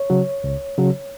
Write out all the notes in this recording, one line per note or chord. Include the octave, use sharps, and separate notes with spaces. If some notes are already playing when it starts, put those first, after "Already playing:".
Already playing: C#5
C#3 F#3
C#2
C#3 F#3